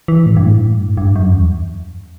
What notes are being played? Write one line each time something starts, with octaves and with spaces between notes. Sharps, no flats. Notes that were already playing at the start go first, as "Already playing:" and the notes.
E3
A2
G2
A2
G2
G2
F#2
E2